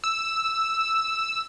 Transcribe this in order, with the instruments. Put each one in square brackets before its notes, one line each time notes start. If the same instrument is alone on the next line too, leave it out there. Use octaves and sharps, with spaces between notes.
[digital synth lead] E6